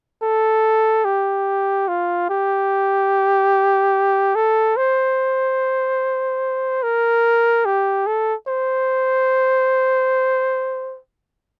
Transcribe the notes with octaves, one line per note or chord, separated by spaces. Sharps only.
A4
G4
F4
G4
A4
C5
A#4
G4
A4
C5